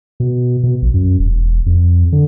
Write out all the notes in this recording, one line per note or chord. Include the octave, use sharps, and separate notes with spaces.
B2
B2
A#1
F#2
E1
F2
D3